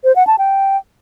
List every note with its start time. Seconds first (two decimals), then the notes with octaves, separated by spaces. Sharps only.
0.04 C5
0.16 F#5
0.27 A5
0.39 G5